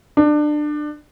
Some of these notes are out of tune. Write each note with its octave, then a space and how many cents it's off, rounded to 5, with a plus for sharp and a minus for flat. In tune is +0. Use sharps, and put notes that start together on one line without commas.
D4 +25